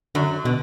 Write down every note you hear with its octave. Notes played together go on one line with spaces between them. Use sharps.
F#2 D3 F#3
B2 D3